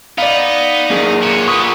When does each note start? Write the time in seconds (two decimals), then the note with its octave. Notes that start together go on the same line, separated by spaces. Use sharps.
0.18 B3 D#4 D5 F5
0.90 E2 A#3 G#4 A#4
1.23 A#2 D3 C#5
1.48 G4 B4 C#6 D#6